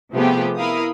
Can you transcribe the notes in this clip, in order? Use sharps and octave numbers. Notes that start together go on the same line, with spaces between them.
C3 F3 A3 B3 G4 G#4
E4 A#4 F5 B5 D#6